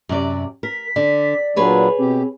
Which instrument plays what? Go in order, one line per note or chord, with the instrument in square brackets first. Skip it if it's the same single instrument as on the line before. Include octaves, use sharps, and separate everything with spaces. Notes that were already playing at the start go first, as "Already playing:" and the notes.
[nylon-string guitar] F#2 C3 D5
[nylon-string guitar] A#4 [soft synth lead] B6
[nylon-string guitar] D3 [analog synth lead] D5
[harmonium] A#2 F#3 D4 [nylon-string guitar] G#4 B4 C#5 [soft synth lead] B5
[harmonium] B2 G4 [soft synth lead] C4